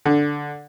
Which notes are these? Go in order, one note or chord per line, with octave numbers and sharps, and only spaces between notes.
D3